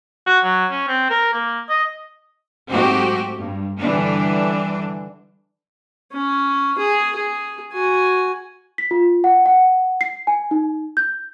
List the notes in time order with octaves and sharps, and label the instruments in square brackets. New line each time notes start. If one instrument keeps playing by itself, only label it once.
[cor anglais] F#4
F#3
C#4
C4
A#4
A#3
D#5
[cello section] G#2 F#3 A3 C4 F#4 G4
G2
D3 E3 G3 D4
[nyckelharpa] C#4
G#4
G#4
F#4 G#5
[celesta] B6
F4
F#5
F#5
C7
G#5
D#4
G6